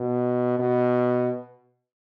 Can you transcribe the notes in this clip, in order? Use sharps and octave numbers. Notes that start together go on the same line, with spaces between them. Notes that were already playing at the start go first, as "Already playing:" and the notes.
Already playing: B2
B2